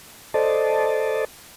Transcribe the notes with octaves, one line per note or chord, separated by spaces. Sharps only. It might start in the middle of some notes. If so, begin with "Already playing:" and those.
A4 C5 D5 D#5 A5